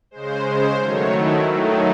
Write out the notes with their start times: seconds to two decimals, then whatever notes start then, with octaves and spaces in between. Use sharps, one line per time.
0.11 C#3 G#3 C5
0.46 C5
0.79 D#3 F#3 A3 C#5
1.14 E4
1.47 D#3 F#3 A3 D#4